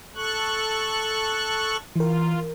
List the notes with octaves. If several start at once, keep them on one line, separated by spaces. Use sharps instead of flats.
A4 C#6 F#6
E3 F4 A#4